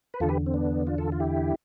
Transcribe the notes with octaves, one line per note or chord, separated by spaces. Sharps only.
B4
E2 D3 F4 A4
G4 B4
C4
B3 D4
D4 F4
F4 A4
F4
E4 G4